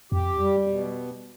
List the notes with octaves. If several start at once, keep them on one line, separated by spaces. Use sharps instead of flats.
F2 G4
G3
B2